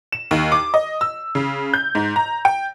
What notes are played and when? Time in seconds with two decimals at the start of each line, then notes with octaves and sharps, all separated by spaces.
0.12 E7
0.31 D#2
0.52 D6
0.74 D#5
1.01 E6
1.35 C#3
1.74 G6
1.95 G#2
2.16 A#5
2.45 G5